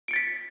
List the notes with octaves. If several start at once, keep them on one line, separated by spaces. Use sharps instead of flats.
A6 B6 C#7 D7